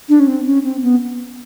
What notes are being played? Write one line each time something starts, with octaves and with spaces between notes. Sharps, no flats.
D4
C#4
C4
C#4
C4
B3